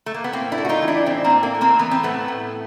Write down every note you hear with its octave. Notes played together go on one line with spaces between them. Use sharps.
A3
A#3
B3
A2 A#3 C4
D4 E4
A3
F#4
D#4 F4
E3
D4 E4
A2 C4 D4
A#3 C4
A2
A#3
A3
A#3 C4
E3 B3
C4
A2 A3 B3
A2